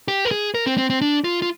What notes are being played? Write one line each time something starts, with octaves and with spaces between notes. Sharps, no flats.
G4
A#4
G#4
A#4
C4
C4
C4
D4
F4
F4